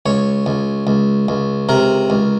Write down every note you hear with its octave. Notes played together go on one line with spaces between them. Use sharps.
C#2 C#5
C#2
C#2
C#2
C3 A#4
C#2